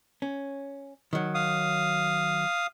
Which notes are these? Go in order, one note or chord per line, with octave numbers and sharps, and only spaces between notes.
C#4
D#3 F#3
F5 D#6